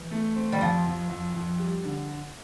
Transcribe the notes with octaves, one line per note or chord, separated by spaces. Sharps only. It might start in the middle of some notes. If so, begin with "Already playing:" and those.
Already playing: E3
A3
C4
G3
F2 F3
F2
F2
F2
G3
D3